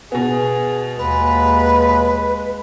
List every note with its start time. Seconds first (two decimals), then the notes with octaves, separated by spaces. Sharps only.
0.12 B2 B3 G#4
0.97 D#2 G#3 B4